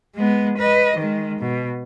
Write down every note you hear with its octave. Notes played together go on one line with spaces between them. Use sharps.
G#3 B3
B4 D#5
D#3 G#3
B2